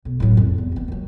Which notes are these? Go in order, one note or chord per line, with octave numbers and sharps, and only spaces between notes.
B1
A2 F#3
F2
E2
E3 A#3
D#3 F#3